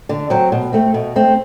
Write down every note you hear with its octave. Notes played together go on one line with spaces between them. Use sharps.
D3
F#3 C4
B2
A3 C4
B2
A3 C4